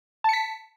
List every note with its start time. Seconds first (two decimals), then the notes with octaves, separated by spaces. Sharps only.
0.24 A5
0.29 C#7
0.33 B6